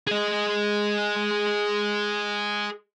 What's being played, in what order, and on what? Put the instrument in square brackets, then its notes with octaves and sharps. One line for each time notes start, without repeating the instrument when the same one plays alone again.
[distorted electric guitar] G#4 D#5